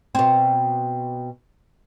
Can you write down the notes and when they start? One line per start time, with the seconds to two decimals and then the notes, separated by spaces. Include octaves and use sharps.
0.15 B2 C4